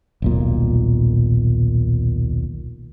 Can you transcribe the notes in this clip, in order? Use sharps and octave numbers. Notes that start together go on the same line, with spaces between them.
D#1 B1 A#2